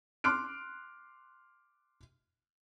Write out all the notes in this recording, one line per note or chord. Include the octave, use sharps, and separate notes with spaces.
C6 D6 F6 F#6 D7